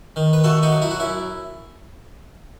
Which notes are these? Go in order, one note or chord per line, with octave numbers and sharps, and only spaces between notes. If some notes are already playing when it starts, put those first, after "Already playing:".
D#3
B4
A3 F#4 A4
D#4 F#4
F#3
E4
F#4
F#2 E4